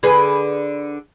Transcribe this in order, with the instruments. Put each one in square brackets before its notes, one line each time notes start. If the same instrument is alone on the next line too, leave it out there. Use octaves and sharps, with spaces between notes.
[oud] D3 G#4 B4